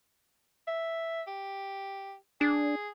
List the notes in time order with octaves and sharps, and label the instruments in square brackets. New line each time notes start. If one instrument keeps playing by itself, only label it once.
[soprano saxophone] E5
G4
[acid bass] D4 [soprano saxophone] G#4